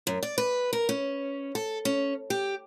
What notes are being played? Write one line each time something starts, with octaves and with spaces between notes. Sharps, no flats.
F#2
D5
B4
A#4
C#4
A4
C#4
G4